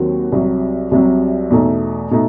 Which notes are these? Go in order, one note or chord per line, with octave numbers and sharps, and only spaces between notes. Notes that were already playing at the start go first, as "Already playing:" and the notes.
Already playing: D#2 D#3 F#3 C4 F#4
C2 C3 F#3
C2 C3 F#3
E2 B2 A3 D#4
B2 A3 D#4